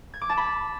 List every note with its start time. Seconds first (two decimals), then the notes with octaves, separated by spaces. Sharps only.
0.14 G#6
0.22 D6
0.29 A5
0.37 B5